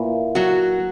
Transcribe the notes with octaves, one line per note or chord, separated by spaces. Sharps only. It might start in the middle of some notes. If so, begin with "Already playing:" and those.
Already playing: A#2 A#3 E4 B4
F#3 F#4